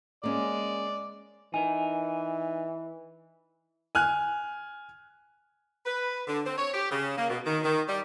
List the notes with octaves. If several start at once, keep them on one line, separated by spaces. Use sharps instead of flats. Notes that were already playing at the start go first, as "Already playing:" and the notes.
G#3 A#3 C#4 D5
E3 D#4 A#4 G#5
G#5 F6 F#6
B4
D3
C4
C#5
G4
C#3
A#3
B2
D#3
D#3
G3